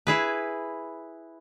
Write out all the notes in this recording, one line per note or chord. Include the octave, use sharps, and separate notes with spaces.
E4 G#4 B4